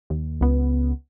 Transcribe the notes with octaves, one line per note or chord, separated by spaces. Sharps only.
D#2
C#2 B3